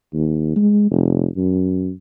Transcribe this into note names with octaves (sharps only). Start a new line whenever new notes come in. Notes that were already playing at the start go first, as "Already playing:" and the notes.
D#2
G#3
F1
F#2